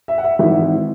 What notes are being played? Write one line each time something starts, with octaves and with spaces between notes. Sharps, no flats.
E5
F#5
E5
G#1 G#2 E3 E5